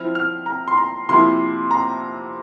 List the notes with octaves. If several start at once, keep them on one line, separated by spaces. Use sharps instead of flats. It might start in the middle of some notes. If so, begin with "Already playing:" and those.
Already playing: F3 C4 E4 F6
F6
A#5
C6
A#5
C3 F3 A#3 E4 C6
A#5